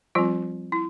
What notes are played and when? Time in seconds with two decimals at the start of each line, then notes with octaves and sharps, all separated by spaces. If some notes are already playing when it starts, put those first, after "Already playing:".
0.15 F3 G3 C4 F4
0.72 E4